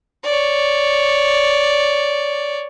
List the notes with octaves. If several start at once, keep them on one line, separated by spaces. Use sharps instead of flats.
C#5 D5